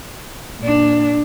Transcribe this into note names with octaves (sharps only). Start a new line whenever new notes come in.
A#2 D4